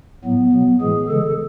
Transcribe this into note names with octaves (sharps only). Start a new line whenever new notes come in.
A2 F#3 B3
B2 F#3
A2 E3 G#3 G#4
C#3 E3 G#3 A4